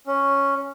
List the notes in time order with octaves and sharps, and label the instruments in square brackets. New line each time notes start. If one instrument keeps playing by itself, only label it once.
[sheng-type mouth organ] C#4